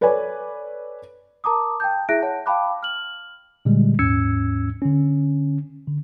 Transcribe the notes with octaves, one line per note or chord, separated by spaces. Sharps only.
A4 B4 C#5 D5 G#5
A#4 A5 A#5 D6 D#6
G5 A5 G6
E4 G#4 E5 F#6 A#6 D7
C#5 F#5 A5
F5 G5 A5 B5 D6 F#6
F6 F#7
A#2 D3 G3 G#3
D#2 G#2 C#4 E6 G#6 C#7
D3 C#4
D3